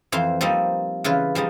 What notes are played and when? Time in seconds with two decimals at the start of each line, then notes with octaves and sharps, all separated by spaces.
0.12 F2 E3 C5 F5 C6
0.41 F3 G3 A#3 C4 D#4
1.04 C#3 E3 F4 B4
1.35 F3 G3 G#3 D#4